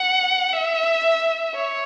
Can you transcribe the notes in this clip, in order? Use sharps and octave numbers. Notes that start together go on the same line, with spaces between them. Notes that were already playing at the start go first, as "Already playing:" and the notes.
Already playing: F#5
E5
C#5